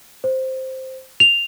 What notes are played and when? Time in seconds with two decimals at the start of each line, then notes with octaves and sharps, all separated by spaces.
0.24 C5
1.20 F7